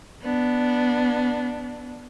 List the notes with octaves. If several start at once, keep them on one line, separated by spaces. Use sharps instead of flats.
B3 D4